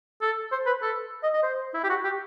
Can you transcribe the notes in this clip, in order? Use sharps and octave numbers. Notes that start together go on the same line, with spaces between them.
A4
C5
B4
A4
D#5
D#5
C5
E4
G4
F#4
G4